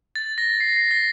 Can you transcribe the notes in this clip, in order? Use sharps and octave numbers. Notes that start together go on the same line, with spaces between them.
A6
A#6
C7
C7
A#6